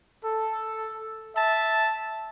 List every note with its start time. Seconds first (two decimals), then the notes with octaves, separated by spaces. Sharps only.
0.25 A4
1.36 E5 A5